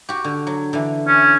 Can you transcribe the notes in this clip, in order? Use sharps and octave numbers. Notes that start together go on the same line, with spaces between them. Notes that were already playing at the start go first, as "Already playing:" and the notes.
F#4 G4
D3
F#3
D3 E3
C#4